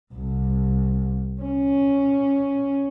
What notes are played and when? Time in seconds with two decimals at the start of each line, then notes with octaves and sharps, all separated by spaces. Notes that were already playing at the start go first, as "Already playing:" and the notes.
0.14 C2
1.42 C#4